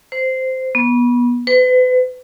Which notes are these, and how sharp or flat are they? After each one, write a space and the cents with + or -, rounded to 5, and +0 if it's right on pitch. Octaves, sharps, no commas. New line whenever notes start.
C5 -10
B3 -25
B4 +40